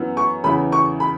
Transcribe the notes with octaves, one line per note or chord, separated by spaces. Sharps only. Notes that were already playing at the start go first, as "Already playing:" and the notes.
Already playing: F#2 E3 B3
C#6
E2 C#3 E3 B5
C#6
B5